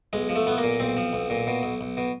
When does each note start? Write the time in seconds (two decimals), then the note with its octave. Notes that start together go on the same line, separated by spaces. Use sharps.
0.13 B1 G#3
0.29 F3
0.36 A3
0.46 B1 B3
0.58 A#3
0.63 A#2
0.80 B1 C4
0.97 F3
1.13 B1
1.30 A#2
1.47 B2
1.63 B1
1.81 B1
1.97 B2